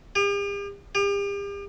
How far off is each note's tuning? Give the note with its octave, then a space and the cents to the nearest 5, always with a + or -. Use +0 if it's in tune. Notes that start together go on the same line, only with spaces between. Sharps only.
G4 +45
G4 +40